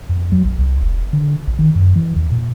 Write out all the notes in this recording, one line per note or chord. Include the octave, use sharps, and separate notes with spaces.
F2
F#3
A#1
C2
E1
D3
A#1
D#3
F#2
E3
E2
A#2